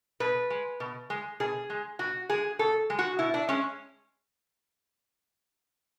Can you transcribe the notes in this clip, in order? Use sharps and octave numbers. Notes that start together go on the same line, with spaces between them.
B2 B4
G#3
B2
G#3
B2 G#4
G#3
B2 F#4
G#3 G#4
B2 A4
G#3
F#4
B2 E4
D4
G#3 C#4